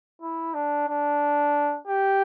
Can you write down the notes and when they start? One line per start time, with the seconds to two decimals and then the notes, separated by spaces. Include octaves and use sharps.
0.22 E4
0.54 D4
0.89 D4
1.87 G4